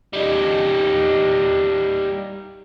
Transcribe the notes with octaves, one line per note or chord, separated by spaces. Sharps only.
G3 D#4